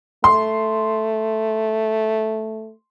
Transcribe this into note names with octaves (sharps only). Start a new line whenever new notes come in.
A3 C6